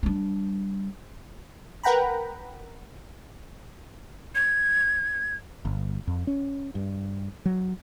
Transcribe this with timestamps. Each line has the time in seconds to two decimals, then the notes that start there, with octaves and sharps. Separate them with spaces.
0.03 G3 D4
1.83 A#4 B4 F#5 G5 A#5 B5
4.35 G#6
5.65 G1
6.07 F2
6.27 C#4
6.75 G2
7.46 F#3